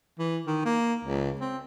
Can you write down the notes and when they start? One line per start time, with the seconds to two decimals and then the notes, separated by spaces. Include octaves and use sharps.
0.19 E3
0.47 D#3
0.65 A#3
1.05 C#2
1.41 C4